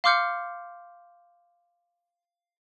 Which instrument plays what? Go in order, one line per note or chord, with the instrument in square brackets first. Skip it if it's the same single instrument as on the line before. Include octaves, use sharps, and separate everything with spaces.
[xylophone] F5 C6 D6 F6 G6 C#7